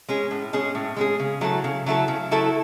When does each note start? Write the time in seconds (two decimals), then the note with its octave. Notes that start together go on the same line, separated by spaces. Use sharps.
0.08 G#3 C#4 G#4
0.31 A2
0.53 G#3 C#4 G#4
0.75 A2
0.96 G#3 C#4 G#4
1.19 C#3
1.41 F#3 A3 E4 A4
1.64 C#3
1.86 F#3 A3 E4 A4
2.08 C#3
2.31 F#3 A3 E4 A4